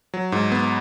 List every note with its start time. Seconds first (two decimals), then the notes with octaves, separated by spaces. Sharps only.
0.14 F#3
0.32 G#2
0.52 B3